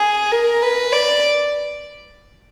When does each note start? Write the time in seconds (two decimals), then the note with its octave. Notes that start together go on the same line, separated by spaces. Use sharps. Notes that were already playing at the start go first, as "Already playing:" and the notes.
Already playing: G#4
0.32 A#4
0.62 B4
0.93 D5